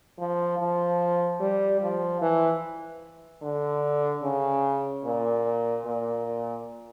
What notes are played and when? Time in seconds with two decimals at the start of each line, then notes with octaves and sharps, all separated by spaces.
0.19 F3
0.59 F3
1.40 G3
1.81 F3
2.21 E3
3.42 D3
4.23 C#3
5.05 A#2
5.85 A#2